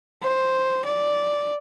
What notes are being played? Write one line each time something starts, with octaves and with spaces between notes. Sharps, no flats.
C5
D5